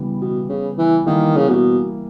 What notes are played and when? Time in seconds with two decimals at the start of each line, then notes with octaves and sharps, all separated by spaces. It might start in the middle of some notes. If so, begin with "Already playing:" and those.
Already playing: C#3 E3 G3 B3
0.21 B2
0.49 C#3
0.78 E3
1.06 D#3 E3 G3 A#3
1.36 C#3
1.49 B2